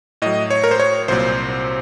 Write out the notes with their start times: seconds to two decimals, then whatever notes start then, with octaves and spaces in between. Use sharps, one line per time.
0.22 A2 F#3 D#5
0.50 C#5
0.64 A#4
0.71 C5
0.80 C#5
1.08 C2 A#2 F#3 C5